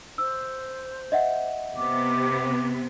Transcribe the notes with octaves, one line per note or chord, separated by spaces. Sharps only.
C5 E6
D#5 E5 F#5
C3 B3 D6